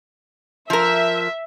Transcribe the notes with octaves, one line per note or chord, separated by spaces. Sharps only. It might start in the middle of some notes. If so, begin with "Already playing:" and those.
F3 A#4 E5